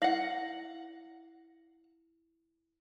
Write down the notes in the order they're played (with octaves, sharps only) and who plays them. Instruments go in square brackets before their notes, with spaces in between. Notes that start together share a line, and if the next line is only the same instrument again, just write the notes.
[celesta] E4 A#6 F#7 [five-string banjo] F5 F#5